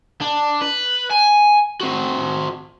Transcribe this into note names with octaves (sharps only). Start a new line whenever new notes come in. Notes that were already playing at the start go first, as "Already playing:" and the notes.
D4
B4
G#5
C4 F#4